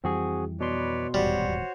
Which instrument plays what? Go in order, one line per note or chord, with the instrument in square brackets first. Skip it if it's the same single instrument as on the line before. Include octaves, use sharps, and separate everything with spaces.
[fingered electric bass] F2 E3 G3 [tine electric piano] C4 F#4 G#4
[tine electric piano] B2 C6 [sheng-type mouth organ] B4 C#5 D5
[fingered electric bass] D#1 E2 G#2 [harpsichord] G3 [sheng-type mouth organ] F#4 C5 C#5